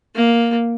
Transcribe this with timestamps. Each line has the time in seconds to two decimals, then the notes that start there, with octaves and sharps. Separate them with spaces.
0.15 A#3